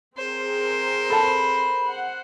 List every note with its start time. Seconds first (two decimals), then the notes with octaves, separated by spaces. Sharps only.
0.17 C4 G#4 A#4 C5
1.10 A4 A5 B5
1.88 F#5